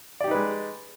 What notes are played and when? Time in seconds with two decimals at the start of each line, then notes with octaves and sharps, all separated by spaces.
0.20 D5
0.24 G4
0.28 D#4
0.31 B4
0.35 G#3